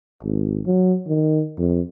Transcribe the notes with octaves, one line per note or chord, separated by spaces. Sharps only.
G#1
F#3
D#3
F2